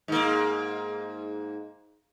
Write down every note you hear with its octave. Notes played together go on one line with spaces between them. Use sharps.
G#2 A#3